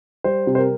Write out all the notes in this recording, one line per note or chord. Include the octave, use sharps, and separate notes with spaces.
G3 C5
C3
C5
A#4